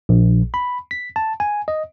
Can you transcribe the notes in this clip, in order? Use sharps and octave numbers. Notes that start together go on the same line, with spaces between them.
A#1
B5
B6
A5
G#5
D#5